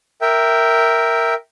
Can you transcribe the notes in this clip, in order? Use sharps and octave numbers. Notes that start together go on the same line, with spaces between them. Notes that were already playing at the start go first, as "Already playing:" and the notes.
A#4 E5 G5